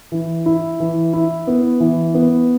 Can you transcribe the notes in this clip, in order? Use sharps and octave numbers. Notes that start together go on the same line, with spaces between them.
E3
E4
E3
E4
B3
E3
B3